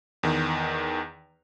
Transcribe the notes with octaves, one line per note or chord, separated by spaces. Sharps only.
E2 D#3